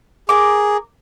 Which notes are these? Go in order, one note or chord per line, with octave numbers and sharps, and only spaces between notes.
G#4 A#4 D6